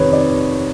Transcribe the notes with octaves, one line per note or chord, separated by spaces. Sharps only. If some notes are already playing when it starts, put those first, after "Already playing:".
Already playing: F2 C3 D#3 B4 C#5
D5